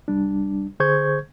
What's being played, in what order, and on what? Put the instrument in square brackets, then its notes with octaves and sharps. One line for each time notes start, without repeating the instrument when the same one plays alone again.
[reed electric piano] C2 G3 D4
D3 G#4 C5 C#6 G6 G#6